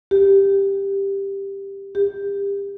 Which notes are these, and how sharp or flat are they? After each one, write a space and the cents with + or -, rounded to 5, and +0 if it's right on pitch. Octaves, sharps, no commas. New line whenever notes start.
G4 +10
G4 +30